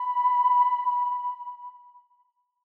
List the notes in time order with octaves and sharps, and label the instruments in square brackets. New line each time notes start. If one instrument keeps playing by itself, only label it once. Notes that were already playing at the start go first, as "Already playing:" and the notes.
Already playing: [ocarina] B5